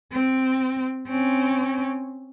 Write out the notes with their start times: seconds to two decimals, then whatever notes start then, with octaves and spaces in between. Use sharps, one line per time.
0.12 C4
1.07 C4 C#4